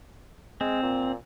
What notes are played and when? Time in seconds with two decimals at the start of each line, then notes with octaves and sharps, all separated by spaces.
0.61 G#3 C4
0.82 A#2